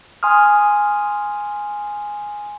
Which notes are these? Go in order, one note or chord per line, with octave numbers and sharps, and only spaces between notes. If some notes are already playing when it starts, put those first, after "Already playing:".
G#5 C6 D#6 F6